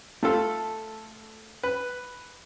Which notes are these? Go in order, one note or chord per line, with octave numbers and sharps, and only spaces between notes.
A3 F4 A4
B4